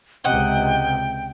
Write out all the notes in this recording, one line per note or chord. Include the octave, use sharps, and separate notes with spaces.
C#2 C3 D#5 F#5 G5